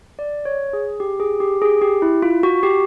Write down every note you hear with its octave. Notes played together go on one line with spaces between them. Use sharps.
D5
C#5
G#4
G4
G#4
G4
G#4
G4
E4
F4
F#4
G4